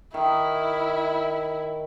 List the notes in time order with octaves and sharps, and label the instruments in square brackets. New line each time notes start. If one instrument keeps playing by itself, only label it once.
[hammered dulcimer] D#3 [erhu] E4